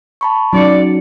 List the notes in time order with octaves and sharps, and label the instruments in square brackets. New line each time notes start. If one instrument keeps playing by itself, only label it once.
[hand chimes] A5 B5 C#6
[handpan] F#3 C#4 [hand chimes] D#4 F#4 C#7 [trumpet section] D5